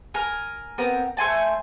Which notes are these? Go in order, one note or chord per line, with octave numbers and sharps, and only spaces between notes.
A#4 G#5
B3 C4 A#4
A3 C5 G#5 A5